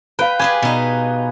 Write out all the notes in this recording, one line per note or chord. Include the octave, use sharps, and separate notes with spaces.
B4 F5 G5 B5
G4 G#4 B4 G#5
B2 D#4